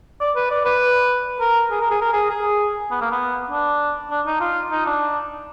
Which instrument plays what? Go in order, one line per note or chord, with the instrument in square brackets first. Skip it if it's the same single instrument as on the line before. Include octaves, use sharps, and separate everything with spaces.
[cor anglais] D5
B4
D5
B4
A#4
G#4
A#4
G#4
A#4
G#4
G#4
B3
A#3
B3
D4
D4
D#4
F4
D#4
D4